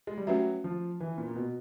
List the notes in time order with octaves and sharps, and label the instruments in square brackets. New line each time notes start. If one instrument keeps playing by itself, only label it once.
[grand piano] G#3
G3
[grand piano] F#3 [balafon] A3 C#4 F#4 B4 E5
[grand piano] F3
E3
A#2
A#2
B2